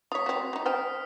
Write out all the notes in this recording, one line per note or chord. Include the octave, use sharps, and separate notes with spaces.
F4 C#5 D#6 B6
C4 F#4
F#3 D#4
C5 G5 G#5 D#6 F6